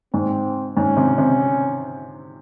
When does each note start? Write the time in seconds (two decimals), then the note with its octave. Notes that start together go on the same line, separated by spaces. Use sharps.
0.14 G#2 C4
0.76 G#2 C#4
0.97 C3
1.18 C3